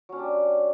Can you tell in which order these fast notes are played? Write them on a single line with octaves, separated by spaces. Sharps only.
F#3 C#4 D4 G4